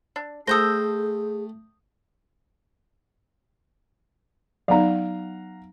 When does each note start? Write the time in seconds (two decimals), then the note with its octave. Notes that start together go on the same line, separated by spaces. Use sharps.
0.16 D4
0.48 A3 G#4 A4 C5 G5 D#6 G6 A#6
4.68 F#3 B3 D#4 F5 F#5 A#5